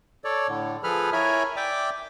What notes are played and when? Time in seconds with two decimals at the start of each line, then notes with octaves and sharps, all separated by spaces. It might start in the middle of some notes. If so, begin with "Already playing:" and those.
0.24 A4 C#5 D5
0.48 A2 D3
0.83 F3 G#4 A4 B4 B5 F6
1.12 E4 A#4 C#5 E5 G#5 B5
1.56 D5 E5 G5 D6